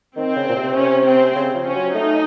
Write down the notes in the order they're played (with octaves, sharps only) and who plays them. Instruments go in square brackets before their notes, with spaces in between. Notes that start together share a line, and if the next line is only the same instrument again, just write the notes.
[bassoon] D#3 [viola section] C4
[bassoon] C#3
A#2
C3
[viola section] C#4
C4
[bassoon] C#3
F3
[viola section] C#4
[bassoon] F#3
[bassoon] A3 [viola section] D#4